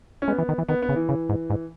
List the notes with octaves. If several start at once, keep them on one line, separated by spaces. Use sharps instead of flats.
C#4
G#3 B3
E3
D#3
E3
D#3 B3
B3
C#3
E3
C#3
G#2
G#2